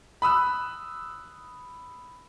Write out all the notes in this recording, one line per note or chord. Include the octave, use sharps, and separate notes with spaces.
B5 D#6 E6 F#6